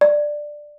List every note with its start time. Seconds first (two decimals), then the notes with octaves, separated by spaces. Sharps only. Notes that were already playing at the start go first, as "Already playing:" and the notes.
0.01 D5